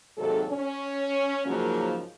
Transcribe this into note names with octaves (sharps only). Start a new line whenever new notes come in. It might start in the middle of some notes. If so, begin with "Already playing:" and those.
D#2 G#2 C3 F#3 A4
C#4
G#2 C#3 F3 F#3 A#3